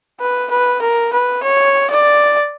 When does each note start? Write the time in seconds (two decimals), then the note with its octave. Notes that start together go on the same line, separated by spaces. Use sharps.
0.20 B4
0.50 B4
0.81 A#4
1.13 B4
1.43 C#5
1.90 D5